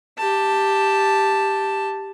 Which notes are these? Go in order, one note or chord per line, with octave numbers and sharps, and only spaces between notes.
G4 A5